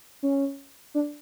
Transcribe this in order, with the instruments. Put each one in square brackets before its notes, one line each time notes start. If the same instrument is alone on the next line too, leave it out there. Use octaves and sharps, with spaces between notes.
[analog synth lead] C#4
D4